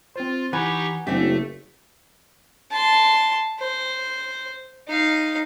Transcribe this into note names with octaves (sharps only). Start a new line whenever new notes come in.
C4 F4 C5
E3 D#4 G4 B4 F#5 G#5 C#6
F#1 A3 C4 D4 G4 E5
A5 C6
C5
D#4 F5